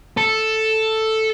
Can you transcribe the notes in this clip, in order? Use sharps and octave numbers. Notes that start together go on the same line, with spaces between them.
A4